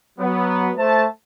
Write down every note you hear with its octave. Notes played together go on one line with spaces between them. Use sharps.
F#3 B3
A3 C5 A5